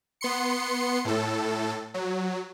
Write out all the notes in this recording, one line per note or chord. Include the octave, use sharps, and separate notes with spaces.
B3 C6 C#7
A2 A4
F#3